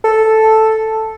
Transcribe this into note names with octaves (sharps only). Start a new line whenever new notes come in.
A4